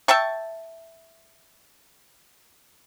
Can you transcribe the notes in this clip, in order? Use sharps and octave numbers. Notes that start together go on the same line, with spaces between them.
E5 G5 A5 C#6